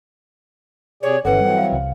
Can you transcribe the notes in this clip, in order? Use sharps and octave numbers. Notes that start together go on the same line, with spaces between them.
C3 G#4 C#5 D5
G1 E3 C#4 A4 B4 F#5
E3 F#3 G3 C4
F5
C2